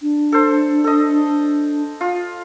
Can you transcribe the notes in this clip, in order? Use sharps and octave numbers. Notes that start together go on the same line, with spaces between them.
D4
A4 C5
A4 D#5
F4